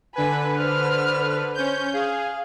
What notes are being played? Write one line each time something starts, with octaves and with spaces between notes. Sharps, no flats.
D3 B4 G#5 B5
C5 F6
C#4 C5 G6
G#4 F5